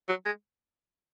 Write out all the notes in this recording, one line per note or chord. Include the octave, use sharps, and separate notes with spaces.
F#3
G#3